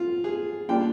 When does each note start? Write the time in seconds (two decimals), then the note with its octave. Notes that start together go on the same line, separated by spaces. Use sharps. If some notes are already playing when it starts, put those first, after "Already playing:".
Already playing: F4
0.24 G#4
0.69 A#2 G3 D4 F4 G5